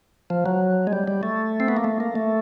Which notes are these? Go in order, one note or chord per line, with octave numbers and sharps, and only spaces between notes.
F3
F#3
G#3
G3
G3
A3
C4
B3
A#3
A3
A#3
A3